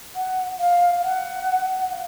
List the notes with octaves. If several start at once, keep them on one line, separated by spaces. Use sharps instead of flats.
F#5
F5
F#5
F#5
F5